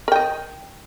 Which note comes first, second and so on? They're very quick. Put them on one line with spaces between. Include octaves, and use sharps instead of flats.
A#4 G5 D#5